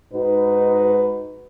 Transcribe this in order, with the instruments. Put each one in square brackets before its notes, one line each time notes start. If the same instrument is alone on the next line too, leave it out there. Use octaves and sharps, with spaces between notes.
[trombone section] G#2 D#4 F#4 B4